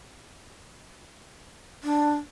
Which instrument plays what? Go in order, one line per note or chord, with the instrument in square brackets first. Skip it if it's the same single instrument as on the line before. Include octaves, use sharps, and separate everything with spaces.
[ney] D4